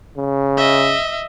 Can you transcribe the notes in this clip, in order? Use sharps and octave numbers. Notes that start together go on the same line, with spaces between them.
C#3
D#5 E5